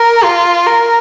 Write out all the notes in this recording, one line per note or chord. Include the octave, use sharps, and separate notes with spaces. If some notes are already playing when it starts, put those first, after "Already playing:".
Already playing: A#4
F4
A#4